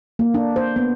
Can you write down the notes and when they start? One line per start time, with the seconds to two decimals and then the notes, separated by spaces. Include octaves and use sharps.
0.19 A#3
0.34 D4
0.56 C5
0.76 B3